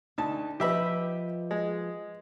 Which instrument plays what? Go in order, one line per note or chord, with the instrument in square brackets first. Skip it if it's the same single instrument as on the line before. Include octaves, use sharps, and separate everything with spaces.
[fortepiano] D2 A5 [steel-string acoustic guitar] D#4
[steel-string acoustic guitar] F3 B4 D#5 [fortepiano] G4 E5 B5
[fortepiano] G#3